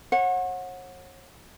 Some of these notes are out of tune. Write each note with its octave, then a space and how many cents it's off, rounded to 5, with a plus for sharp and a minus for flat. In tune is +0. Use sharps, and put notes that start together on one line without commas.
C#5 -40 F#5 -20